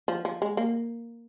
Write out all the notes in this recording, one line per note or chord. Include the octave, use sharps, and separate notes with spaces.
F3
F3
G#3
A#3